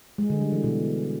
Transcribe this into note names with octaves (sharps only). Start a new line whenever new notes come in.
G#3
D3
G3
E3
B2